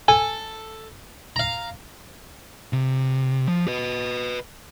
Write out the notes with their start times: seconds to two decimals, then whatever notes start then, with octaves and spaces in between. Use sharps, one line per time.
0.08 A4 G#5
1.36 F5 A#5
2.73 C3
3.48 F3
3.68 B4 D#5